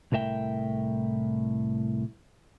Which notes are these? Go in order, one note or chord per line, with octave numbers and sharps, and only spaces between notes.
C2 A2 A#4 E5 G5